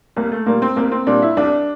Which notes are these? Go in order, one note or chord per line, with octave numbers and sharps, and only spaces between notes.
C2 A#3
A3
A#2 G3 A#3
C4
C2 A#3
C4
A#2 G3 D4
E4
C2 D4